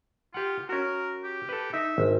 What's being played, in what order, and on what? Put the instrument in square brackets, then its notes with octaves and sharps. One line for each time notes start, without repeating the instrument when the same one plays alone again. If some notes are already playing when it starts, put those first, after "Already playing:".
[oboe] F4 [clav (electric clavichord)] G4 F#5
[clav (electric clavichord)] C#4 F#4 [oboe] A#4
[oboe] G4
[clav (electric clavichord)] A4 B4
[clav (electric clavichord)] D#4 [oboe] E5
[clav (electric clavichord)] G#1